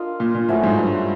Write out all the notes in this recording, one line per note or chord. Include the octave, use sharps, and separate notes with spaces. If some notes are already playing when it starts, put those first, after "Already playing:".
Already playing: D4 F4 A#4 D#5
A#2
A#2
A2 F3 A3 C#4 F#4
G#2
G2